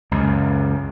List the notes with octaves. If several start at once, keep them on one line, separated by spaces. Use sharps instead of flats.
C#2 F#2